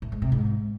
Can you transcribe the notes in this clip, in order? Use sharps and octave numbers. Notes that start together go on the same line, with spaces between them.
A2
G#2
C3
G#2